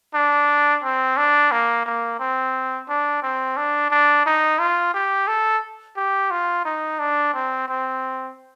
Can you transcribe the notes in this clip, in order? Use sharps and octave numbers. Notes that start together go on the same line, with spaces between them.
D4
C4
D4
A#3
A#3
C4
D4
C4
D4
D4
D#4
F4
G4
A4
G4
F4
D#4
D4
C4
C4